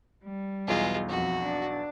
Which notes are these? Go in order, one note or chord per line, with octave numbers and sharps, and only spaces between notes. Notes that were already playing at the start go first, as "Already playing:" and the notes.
G3
B1 E2 G#3 F4
F2 F#4
D4